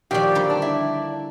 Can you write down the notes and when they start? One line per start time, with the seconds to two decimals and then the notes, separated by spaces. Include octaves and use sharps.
0.11 A#2 D#3 F3 F#3 G4 D5
0.35 D3 G3 A#3
0.50 D4
0.62 E4